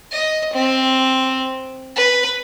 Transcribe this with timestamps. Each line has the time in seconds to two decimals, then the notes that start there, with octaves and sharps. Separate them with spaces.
0.12 D#5
0.53 C4
1.96 B4